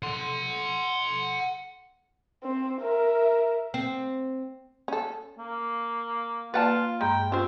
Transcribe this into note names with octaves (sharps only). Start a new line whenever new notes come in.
F#5 C6
C4
A#4 E5
C4
C#4 A4
A#3
A#3 F4 B4 D5 F#5 A5 A6
G2 G#3 G5 A#5
C4 C#4 F4 G4 C5